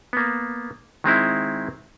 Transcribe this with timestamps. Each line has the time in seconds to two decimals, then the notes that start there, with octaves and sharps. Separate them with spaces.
0.13 A#3 B3
1.04 D#3 G#3 C4 E4